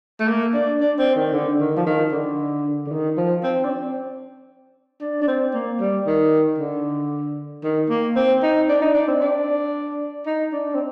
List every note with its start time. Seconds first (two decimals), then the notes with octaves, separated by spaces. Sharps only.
0.20 A3
0.28 A#3
0.54 D4
0.81 D4
0.98 C4
1.16 D#3
1.33 D3
1.60 D#3
1.77 F3
1.86 D#3
2.12 D3
2.86 D3
2.91 D#3
3.17 F3
3.43 C4
3.64 D4
3.70 C4
5.01 D4
5.22 D4
5.28 C4
5.54 A#3
5.80 G3
6.06 D#3
6.58 D3
7.64 D#3
7.90 A#3
8.16 C4
8.43 D#4
8.69 D4
8.82 D#4
8.94 D4
9.08 C4
9.21 D4
10.26 D#4
10.52 D4
10.74 C4